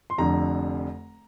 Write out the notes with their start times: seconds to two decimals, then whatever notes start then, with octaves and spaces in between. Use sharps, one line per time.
0.10 C6
0.18 F1 F2 D3 A#5